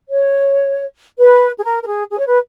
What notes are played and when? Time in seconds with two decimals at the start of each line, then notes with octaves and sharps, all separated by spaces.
0.09 C#5
1.17 B4
1.58 G#4
1.64 A#4
1.82 A#4
1.87 G#4
2.10 G#4
2.19 C#5
2.26 B4